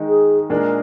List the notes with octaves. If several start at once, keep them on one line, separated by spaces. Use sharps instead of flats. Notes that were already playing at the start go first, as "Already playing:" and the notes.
Already playing: D#3 G#3 D#4
G#4
A#2 G#3 D4 G#4 A#4